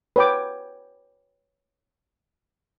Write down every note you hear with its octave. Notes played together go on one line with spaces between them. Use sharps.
B4 C#5 G5 D6